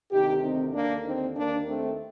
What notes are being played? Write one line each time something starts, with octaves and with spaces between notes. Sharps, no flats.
D2 C3 D#3 D#4 G4
C4 D#4
D#2 D3 A#3 D4
C4 D#4
D#2 D#3 A#3 D4
A3 C4